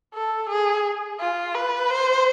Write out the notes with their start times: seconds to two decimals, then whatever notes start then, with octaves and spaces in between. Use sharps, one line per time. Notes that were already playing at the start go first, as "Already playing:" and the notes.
0.14 A4
0.49 G#4
1.19 F4
1.55 B4
1.91 C5